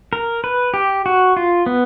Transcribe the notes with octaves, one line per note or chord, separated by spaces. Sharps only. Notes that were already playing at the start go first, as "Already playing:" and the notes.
A#4
B4
G4
F#4
F4
B3